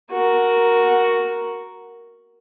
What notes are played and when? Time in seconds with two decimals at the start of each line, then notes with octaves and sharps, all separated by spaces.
0.12 F#4 A#4